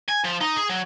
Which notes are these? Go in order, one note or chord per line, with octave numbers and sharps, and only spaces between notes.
G#5
F3
D#4
G#4
F#3